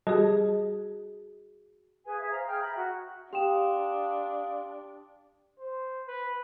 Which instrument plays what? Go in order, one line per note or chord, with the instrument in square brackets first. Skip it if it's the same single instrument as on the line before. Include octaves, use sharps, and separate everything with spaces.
[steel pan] G3 A4 D#5 [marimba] F#4 G#4
[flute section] G#4 B4 F5 G#5
G#4 E5
C5 F5 A#5
G#4 G5 F6 G6
E5 A#5 B5
F#4
[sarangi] D4 [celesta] G4 G5 E7 [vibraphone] F5 C6 D#6
[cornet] C5
B4